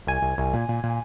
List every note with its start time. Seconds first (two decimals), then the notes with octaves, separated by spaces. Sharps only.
0.07 C2 G#5
0.22 C2
0.38 C2
0.53 A#2
0.69 A#2
0.84 A#2